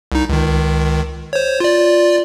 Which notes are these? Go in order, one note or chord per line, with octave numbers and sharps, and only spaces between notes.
C2 D#4
C#2 D#3
C5 C#5
F4 D5